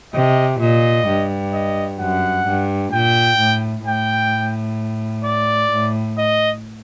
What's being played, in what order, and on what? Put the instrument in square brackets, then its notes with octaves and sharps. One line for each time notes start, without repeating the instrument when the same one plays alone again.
[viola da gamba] C3 [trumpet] D#5
[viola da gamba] A#2 [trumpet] D#5
[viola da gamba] G2
[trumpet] D#5
[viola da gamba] F#2 [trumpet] F#5
[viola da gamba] G2
[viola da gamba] A#2 [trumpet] G5
[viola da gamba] A2
[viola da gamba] A2 [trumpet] G5
[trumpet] D5
[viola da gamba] A2
[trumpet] D#5